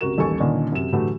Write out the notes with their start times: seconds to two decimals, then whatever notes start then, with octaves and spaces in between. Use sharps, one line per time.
0.01 C#2 C3 F#4 A#4 E7
0.17 D#1 A1 D#2 A4 G#5 C#6
0.40 A#2 D3 D#3 C#4 D4
0.72 F#2 C3 E7
0.93 A2 D3 E3 F#3 A3 G4